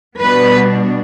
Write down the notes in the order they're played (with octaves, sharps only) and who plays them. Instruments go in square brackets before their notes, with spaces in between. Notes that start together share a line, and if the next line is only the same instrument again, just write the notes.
[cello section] B2 G3 B3 D4 B4